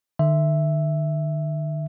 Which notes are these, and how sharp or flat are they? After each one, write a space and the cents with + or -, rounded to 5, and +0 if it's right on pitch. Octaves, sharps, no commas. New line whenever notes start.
D#3 -45 E5 +0